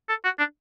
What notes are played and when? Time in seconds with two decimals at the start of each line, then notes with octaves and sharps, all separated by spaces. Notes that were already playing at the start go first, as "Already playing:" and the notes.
0.09 A4
0.24 F#4
0.39 D4